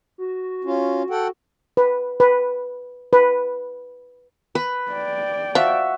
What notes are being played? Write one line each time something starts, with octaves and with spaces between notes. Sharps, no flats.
F#4
C#4 F4
A4 F#5 G5
B4
B4
B4
B4
D5 G5
F3 F#4 E5